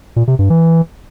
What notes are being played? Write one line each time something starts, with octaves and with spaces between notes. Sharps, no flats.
A#2
C3
G2
E3